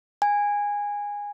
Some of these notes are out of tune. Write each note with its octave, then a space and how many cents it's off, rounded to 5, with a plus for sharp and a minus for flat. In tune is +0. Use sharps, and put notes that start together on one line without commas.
G#5 -15